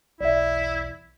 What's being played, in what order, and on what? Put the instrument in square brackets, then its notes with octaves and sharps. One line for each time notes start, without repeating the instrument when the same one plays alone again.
[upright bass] B1 E2 [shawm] E4 [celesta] D5 E5